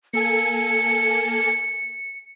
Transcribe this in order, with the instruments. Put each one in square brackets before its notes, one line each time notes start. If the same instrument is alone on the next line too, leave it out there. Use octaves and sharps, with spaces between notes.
[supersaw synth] A#3 A4 G#5 [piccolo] C#7